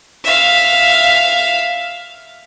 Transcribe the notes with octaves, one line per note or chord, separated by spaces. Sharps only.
E5 F5